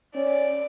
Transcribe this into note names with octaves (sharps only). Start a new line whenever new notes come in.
C#4 D5